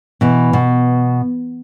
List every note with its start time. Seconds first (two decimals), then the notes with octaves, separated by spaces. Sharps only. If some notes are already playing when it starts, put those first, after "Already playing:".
0.21 B2 E3
0.53 B2